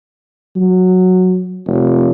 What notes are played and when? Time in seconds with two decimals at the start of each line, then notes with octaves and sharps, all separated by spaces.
0.56 F#3
1.67 F1